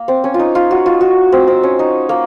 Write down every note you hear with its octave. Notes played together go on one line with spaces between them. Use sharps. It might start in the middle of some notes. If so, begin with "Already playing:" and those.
Already playing: A#3
C4
C#4
F4
D#4
F4
F#4
F4
F#4
C4
C4
C#4
D#4
A#3